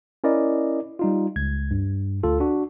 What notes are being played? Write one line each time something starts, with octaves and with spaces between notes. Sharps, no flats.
C#4 E4 A#4 D5 D#5
G3 D#4 F4
C#2 G#6
G2
D2 F4 A4
D4 F#4